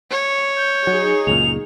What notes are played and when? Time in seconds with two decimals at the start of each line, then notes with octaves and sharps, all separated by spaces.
0.11 C#5
0.57 G6
0.87 F#3 D#4 G#4
1.27 C#2 F#2 A#2 F7